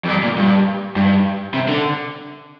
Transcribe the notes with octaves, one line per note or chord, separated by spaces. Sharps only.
F2
G2
A#2
G2
G2
C3
D3